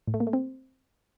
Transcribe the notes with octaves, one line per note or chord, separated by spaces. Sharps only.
A2
A3
A#3
A3
C4